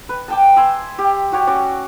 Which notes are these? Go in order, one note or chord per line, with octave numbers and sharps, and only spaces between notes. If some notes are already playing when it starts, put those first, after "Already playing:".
B4
D5 G5 A5
E5 G#5 C6
G4
F#4 G4 C#5
C#4 F#4 D5